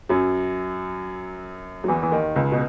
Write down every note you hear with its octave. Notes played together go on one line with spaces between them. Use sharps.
F#2 F#3
F#3
E2 E3
E3
D#2 D#3
C#2 C#3
B2